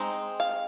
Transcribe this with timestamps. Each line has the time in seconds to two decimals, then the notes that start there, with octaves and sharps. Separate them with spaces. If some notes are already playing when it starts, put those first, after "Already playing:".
Already playing: G#3 C4 D#4
0.40 F5